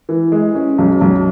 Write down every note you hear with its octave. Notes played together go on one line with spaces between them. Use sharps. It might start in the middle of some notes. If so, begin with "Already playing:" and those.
E3
G#3
C#4
B1
B1